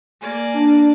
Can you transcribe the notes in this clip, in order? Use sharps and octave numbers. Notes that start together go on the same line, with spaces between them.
A#3 D5 G#5
D4